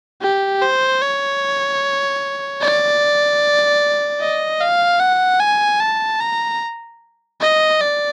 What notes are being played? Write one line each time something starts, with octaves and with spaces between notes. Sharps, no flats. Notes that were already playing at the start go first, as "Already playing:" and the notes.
G4
C5
C#5
D5
D#5
F5
F#5
G#5
A5
A#5
D#5
D5